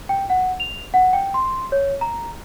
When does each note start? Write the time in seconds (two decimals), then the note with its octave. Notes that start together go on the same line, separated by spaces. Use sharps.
0.09 G5
0.30 F#5
0.60 F7
0.94 F#5
1.13 G5
1.34 C6
1.72 C#5
2.01 A#5